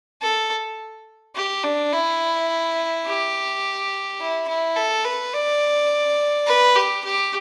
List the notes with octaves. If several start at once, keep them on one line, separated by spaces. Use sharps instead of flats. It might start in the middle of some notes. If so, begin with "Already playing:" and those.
A4
G4
D4
E4
G4
E4
E4
A4
B4
D5
B4
G4
G4